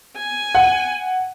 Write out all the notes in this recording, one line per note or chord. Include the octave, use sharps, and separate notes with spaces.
G#5
F#5